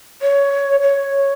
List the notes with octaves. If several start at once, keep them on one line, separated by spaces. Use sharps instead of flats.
C#5
C#5